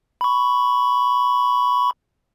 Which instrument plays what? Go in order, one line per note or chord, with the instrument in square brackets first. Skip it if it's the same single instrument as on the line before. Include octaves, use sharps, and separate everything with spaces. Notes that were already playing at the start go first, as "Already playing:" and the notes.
[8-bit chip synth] B5 C#6